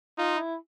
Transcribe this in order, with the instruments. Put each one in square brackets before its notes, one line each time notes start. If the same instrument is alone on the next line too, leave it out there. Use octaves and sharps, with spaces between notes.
[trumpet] D#4 [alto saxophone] F4
[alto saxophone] E4